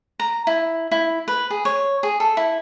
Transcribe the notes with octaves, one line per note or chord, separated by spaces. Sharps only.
A#5
E4
E4
B4
G#4
C#5
G#4
A4
E4